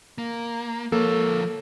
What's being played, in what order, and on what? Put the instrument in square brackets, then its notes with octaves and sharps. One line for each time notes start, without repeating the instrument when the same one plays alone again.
[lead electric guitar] A#3
[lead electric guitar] F3 C#5 [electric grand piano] A#3 A4